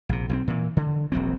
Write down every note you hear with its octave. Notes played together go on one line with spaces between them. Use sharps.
A#1 C3
B1 E3 C4
A#2 E3
D3
E1 A#1 F#3 C4